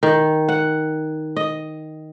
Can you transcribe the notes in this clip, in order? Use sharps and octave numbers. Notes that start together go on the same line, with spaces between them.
D#3
F#5
D#5